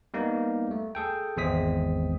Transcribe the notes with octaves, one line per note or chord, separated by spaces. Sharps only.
G3 A#3 B3 D#4
A3
G#4 A4 G5
G#1 E2 G#3 C4 D#6 B6